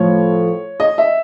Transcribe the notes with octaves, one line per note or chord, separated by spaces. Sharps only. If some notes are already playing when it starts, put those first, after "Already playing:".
Already playing: A2 F3 A3 C#5
D#5
E5